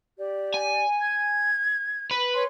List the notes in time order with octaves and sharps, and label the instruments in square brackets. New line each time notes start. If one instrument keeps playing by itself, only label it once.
[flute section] G4 D5
[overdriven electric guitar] G#5
[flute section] G#6
[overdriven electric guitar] B4
[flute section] C#5 G#5 C6